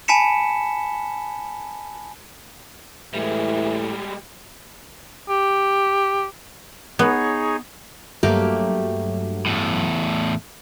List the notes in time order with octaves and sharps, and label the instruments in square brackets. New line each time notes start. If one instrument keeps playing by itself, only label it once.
[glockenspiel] G#5 A5 B5 B6 C#7 E7
[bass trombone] A2 [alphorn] E3 [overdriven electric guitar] G3 G#3
[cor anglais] G4
[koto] B3 [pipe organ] D#4 G#4 C#5
[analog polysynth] G2 F#3 [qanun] A3 A#3 G4
[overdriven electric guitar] E2 A2